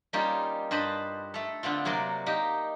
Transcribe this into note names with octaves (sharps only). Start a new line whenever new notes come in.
G3 A#3 C#4 D#4 F4 G4
G2 B4 C5 D#5 A5 B5
A3 A4
D3 B3 C4 F4
C3 F#3 A#3 D5 C6
A#3 D#4 G4